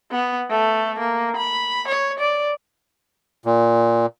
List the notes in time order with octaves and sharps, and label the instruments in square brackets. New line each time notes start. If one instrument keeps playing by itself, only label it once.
[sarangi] B3
A3
A#3
B5
C#5
D5
[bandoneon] A#2